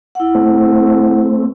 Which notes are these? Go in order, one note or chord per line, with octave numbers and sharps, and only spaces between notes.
E4 F#5
A3 C4